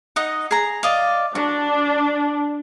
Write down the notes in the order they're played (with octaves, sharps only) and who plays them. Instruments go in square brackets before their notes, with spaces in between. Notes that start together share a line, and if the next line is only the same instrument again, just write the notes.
[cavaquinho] D#4 D#5 F#5
G#4 A#5
D5 D#5 F5
[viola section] D4 [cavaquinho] F#4